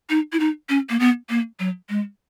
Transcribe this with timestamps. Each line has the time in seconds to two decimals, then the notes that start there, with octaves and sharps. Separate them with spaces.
0.10 D#4
0.33 E4
0.40 D#4
0.69 C#4
0.90 A#3
1.00 B3
1.30 A#3
1.60 F#3
1.89 G#3